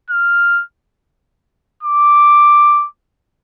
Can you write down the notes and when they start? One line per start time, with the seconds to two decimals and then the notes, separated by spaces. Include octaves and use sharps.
0.10 F6
1.83 D6